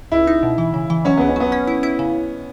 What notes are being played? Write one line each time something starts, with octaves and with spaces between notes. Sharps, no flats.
C#2 E4
D#4
B2
E3
C#3
E3
F#3 C#4
C#2 B3
C#4
F#3 B3
C#4
E4
E4
C#3